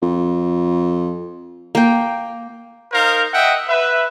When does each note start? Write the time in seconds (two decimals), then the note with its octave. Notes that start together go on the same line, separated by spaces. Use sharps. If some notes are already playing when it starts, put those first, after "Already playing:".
0.02 F2
1.75 A#3 G5
2.93 D#4 A#4 C5 F5
3.33 D#5 E5 F#5 G5
3.69 B4 E5